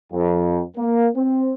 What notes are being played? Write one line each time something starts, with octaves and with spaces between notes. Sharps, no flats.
F2
A#3
C4